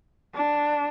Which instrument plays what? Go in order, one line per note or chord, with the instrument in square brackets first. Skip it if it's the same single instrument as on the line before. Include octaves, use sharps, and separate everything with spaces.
[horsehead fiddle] D4